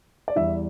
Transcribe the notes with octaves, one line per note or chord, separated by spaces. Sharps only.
D5
E2 E3 G3 E5